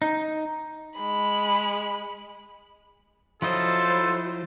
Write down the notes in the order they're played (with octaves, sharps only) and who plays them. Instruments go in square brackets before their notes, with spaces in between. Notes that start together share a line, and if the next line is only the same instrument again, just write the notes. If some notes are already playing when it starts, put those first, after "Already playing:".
[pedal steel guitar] D#4
[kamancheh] G#3 B5
[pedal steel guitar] F3 E4 D#5 [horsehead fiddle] F#3 C5 [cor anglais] F4 [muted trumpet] A4